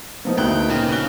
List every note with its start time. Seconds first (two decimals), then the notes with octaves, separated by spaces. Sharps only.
0.25 F3 A#3 B3 D#4
0.38 D2 G5 F#6 F#7
0.70 A#2 C#3
0.91 C#4 F#6 G7